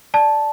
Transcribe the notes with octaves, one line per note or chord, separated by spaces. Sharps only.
D5 A5